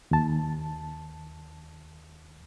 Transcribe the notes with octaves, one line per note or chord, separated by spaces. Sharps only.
D#2 A5